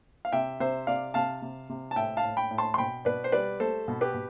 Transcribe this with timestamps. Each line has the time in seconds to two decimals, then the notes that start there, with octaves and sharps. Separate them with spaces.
0.25 F5
0.32 C3 E5 G5
0.60 C3 C5 E5
0.87 C3 D5 F5
1.14 C3 F5 A5
1.42 C3
1.69 C3
1.91 A5
1.96 A2 E5 G5
2.17 F5 A5
2.24 A2
2.37 G5 B5
2.51 A2
2.58 A5 C6
2.74 C6
2.78 B2 G5 B5
3.05 B2 B4 D5
3.24 C5
3.32 G3 B4 D5
3.60 A3 A4 C5
3.88 B2
4.01 G4 B4
4.14 B2